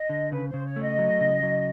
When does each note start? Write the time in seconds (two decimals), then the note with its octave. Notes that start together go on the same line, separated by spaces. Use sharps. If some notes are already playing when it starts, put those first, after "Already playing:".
Already playing: D#5
0.10 D3
0.31 C#3 B4
0.48 C5
0.54 C#3
0.65 C#5
0.76 A3 D#5
0.99 F#3
1.20 C#3
1.43 F#3